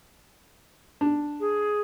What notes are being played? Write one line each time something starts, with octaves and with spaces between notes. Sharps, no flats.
D4
G#4